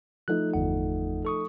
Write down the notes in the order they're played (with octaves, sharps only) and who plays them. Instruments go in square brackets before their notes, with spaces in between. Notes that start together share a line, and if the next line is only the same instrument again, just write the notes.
[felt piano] F3 A3 D#4 [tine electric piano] F#6
[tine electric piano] G1 E2 F#5
A4 C#6 D#6